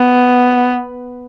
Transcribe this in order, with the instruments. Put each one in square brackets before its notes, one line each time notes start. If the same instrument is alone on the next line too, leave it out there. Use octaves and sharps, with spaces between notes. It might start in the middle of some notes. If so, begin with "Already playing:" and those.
Already playing: [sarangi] B3